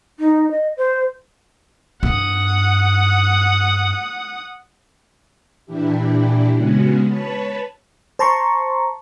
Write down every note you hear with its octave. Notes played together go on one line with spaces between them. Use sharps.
D#4
D#5
C5
G2 F4 F#5 D#6
A#2 E3 D4 E4 G4
C#3 G#3 B3 C#4 F#4
B4 C#5 A5 B5
C5 A5 A#5 C6 C#6